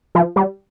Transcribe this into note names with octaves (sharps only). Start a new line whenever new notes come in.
F3
G3